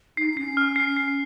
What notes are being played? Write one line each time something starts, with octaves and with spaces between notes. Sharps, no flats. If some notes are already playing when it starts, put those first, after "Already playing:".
D#4 C7
D#4
C#4 C7
F6
C7
C7